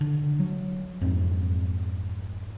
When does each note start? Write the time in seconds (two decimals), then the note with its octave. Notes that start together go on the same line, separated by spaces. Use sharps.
0.01 D3
0.40 F#3
1.01 F2 G#2